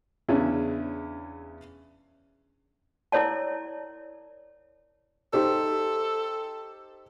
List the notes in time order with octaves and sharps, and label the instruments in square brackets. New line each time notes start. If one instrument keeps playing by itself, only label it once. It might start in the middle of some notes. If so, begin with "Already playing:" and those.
[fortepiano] E2 C#3 C#4 D4 E4
[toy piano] E4 A#4 C#5 D5 A5
[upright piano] D#4 G4 C5 [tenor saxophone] A4